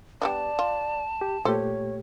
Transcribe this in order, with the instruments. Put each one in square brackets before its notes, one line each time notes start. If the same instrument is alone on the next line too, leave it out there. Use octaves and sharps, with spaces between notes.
[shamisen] G3 B3 D4 [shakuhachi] D5 [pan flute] A5
[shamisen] F4
[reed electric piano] G4
[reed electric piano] A#2 A3 G4 [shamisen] A4 C5 [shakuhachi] C#5